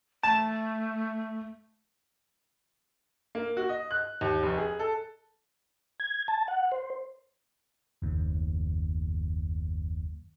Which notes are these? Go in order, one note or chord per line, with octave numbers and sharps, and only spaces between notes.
A3 A5
A#3
F#4
D#5
F#6
D#2
F1
G#4
A4
G#6
A5
F#5
C5
F#1 D#2